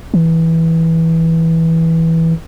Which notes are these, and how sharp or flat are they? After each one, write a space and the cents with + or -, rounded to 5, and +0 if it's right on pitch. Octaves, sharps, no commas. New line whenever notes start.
E3 -10